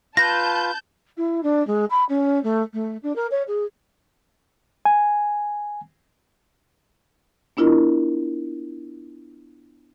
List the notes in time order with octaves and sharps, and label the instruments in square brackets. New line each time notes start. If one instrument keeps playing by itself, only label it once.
[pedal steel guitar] F4 B4 [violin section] A5 G6 [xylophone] A#6
[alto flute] E4
D4
G#3
B5
C#4
A3
A3
D4
A#4
C#5
G#4
[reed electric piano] G#5
[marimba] B3 D4 E4 F4 A#4 D#5